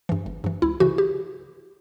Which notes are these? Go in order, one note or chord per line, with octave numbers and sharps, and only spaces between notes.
G2 E3
G1
G2 E3
C#2 E4
C#3 E3 F#4
G4